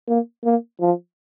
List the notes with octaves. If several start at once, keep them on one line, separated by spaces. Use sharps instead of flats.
A#3
A#3
F3